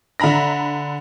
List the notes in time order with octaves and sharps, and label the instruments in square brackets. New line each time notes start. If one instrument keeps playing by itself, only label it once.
[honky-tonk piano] D3 E5 A#5 B5 A#6